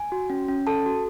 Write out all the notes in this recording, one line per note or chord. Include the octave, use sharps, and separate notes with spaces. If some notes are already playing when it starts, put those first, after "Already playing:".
Already playing: G#5
F#4
C#4
C#4
A4 A5
F#4